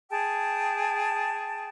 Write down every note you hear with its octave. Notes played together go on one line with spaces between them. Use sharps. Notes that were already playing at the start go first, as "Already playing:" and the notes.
G#4 G5 A5